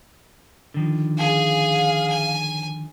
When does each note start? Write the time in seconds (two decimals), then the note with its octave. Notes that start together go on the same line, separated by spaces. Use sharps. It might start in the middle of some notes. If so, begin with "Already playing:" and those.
0.74 D3 D#3 F3
1.18 G#4 F5 G#5
2.10 G#5